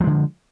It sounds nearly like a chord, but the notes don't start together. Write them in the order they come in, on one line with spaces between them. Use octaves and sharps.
F3 G#3 D3